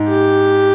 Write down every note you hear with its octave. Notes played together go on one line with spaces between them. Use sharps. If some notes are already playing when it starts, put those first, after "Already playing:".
Already playing: G#2
G4